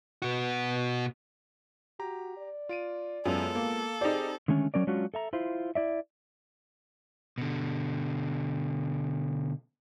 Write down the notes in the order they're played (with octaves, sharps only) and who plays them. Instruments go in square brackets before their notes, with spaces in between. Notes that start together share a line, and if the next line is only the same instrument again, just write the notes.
[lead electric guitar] B2 F#4
[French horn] F#4 [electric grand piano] G4 A#5
[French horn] D5
[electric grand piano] F4 D7 D#7
[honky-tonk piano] F#2 [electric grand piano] G#3 B3 F4 [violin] A4
[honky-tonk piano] A#3
[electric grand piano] C4 G4 C5 [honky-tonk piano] D#4 D5 [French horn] G#4
[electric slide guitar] D3 D#3 G#3 A3 C#4
F#3 C#4 A#4 D5
F#3 G#3 C#4 D4 F4 F#4
A4 E5 A#5
E4 F4 C5
E4 D5 E5
[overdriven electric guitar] B2 D3